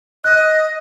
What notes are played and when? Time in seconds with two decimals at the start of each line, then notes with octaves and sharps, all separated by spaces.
0.24 D#5 F#6